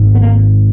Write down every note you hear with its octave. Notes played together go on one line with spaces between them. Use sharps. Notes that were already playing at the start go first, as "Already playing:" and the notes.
Already playing: G#1 G#2
B3
A#3